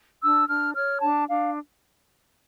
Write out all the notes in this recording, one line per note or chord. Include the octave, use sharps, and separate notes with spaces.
D4 E6
D4 F6
C#5 F6
D4 A5
D4 F5